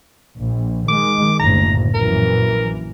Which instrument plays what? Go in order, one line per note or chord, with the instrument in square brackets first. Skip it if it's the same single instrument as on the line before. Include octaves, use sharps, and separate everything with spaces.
[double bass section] A#1
[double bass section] D#3 G#3 [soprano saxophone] D6
[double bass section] F#1 D2 A2 [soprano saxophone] A#5
[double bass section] A#1 F#2 E3 [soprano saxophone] A#4